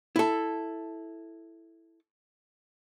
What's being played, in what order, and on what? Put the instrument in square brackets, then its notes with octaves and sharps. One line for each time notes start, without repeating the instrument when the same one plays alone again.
[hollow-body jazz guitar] E4 A4